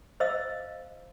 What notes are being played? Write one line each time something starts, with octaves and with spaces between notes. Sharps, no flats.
C5 D#5 F5 E6